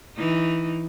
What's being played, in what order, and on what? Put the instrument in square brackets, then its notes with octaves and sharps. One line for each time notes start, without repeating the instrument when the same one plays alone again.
[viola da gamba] E3 D#4